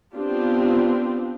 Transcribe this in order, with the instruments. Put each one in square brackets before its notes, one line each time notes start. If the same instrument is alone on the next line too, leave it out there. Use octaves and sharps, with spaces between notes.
[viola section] B3 C4 D4 F4 G4